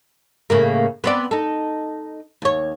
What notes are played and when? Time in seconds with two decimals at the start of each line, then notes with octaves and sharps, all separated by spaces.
0.50 A2 C#3 A#3
1.04 B3 C4 D5
1.31 D#4 A4
2.42 D#2 C#5